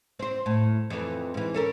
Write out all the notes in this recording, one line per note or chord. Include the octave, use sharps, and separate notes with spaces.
C4 C5
A2
F2 E3
G#2 E3
C#4 A4 A#4